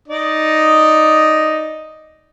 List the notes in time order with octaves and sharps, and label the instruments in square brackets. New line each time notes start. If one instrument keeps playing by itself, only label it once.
[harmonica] D#4 D5 D#5